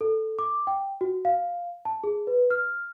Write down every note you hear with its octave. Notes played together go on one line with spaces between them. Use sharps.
A4
D6
G5
F#4
F5
A5
G#4
B4
F6